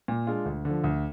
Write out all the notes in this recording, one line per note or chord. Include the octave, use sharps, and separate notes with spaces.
A#2
G#3 D4 F4
D2
D3
F3
D2